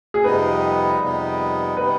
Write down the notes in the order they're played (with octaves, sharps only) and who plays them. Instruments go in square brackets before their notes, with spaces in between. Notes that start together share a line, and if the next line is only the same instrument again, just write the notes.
[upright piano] G#4
[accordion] F2 C3 G3 B3 D#4 [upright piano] B4
[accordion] F2 C3 G3 B3 D#4
[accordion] C3 G3 B3 D#4 [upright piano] B4